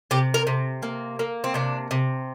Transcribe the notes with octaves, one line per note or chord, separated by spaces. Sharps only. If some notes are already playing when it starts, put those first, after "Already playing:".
C3 G4
A#4
C3
A#3
A#3
C4
C3 D4
C3